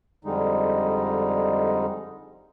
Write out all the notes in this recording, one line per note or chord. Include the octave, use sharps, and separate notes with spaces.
F2 D3 G3 G#3 D#4